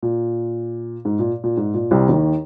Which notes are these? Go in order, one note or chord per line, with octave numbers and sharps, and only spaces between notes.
A#2
G#2
A#2
A#2
G#2
A#2
C2 C3
D#2 D#3